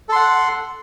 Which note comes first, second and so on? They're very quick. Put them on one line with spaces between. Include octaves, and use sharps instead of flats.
A4 C6 F#5